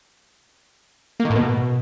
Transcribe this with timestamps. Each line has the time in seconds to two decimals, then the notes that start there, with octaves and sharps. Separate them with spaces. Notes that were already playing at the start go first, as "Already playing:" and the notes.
1.20 A#3
1.25 D#3
1.30 A2
1.35 B2